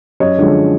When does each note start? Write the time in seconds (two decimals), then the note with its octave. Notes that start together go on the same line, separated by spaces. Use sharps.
0.20 F#2 C#5 D#5
0.38 D3 F3 G#3